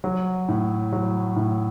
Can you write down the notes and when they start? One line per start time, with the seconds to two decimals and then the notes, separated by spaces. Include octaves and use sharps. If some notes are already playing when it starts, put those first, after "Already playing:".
0.04 F#3
0.48 A2
0.93 F#3
1.36 A2